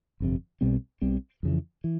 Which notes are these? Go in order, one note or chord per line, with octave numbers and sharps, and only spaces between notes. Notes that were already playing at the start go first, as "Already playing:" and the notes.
G1 F2 C3
B1 B2 G3 C4
B1 B2 G3 C4
F2 C#3 E3
E3